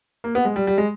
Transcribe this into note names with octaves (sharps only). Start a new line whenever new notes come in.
A#3
B3
G#3
G3
G3
G#3